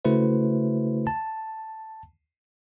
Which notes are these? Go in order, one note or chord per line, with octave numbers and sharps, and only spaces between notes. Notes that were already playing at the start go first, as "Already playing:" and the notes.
C#3 A3 E4 F#4 B4 C5
A5